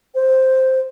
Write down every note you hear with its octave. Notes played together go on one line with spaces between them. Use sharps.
C5